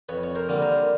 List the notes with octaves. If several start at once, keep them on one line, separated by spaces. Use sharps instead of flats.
F2 B4 C#5
C#5
A#4 C5
D3 G3 A#3
A#4 C5